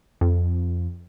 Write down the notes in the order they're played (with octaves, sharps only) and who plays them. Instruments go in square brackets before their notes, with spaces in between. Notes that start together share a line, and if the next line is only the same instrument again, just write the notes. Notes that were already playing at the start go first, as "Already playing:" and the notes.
[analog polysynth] F2